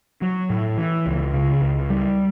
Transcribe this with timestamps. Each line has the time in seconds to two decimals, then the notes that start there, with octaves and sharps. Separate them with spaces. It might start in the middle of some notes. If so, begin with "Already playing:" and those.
0.22 F#3
0.50 A2
0.78 E3
1.06 C#2
1.34 C#3
1.62 C#2
1.90 G3